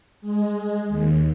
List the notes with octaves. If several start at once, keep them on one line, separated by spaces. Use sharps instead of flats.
G#3
D#2